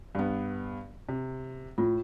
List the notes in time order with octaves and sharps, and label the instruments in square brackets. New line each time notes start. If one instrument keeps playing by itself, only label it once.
[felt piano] G2 B3
C3
[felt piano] A2 [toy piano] F4